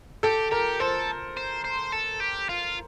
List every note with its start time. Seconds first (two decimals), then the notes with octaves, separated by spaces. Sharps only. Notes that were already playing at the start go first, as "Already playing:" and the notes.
0.23 G4 A4
0.51 G4 A#4
0.80 A4 C5
1.37 C5
1.65 C5
1.93 A4
2.21 G4
2.49 F4